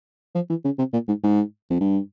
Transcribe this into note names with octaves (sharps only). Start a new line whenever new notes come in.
F3
E3
C#3
C3
A#2
G#2
G#2
F2
G2